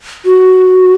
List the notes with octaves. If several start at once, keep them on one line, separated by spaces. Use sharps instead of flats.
F#4